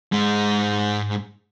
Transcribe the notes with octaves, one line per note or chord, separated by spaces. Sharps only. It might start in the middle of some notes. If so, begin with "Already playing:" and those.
G#2 G#3